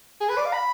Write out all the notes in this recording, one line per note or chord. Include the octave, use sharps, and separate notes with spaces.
G#4
B4
D5
F5
B5